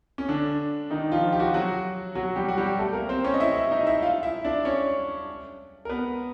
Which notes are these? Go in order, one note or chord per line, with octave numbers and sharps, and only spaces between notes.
C#4
D3 D4
D#3 D#4
F3 F4
G4
F#4
F4
F#3 F#4
F#3 F#4
G3 G4
F#4
G3 G4
A3 A4
A#3 A#4
C4 C5
C#4 C#5
D#5
E4 E5
E4 E5
D#4 D#5
E4 E5
F4 F5
E4 E5
D4 D5
C#4 C#5
A#4
B3 B4